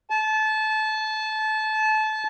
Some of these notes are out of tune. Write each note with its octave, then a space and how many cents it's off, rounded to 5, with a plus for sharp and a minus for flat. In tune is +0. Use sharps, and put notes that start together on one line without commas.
A5 -25